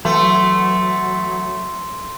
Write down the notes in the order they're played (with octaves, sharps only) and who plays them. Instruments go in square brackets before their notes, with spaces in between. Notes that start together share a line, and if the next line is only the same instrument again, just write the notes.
[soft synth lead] E3 [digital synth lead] F#3 [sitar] A3 [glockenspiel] C6